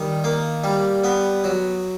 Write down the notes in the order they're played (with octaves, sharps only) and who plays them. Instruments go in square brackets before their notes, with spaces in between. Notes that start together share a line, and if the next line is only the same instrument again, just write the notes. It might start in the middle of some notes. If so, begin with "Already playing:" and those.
Already playing: [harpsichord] D#3 G3
A#3
G3
B3
F#3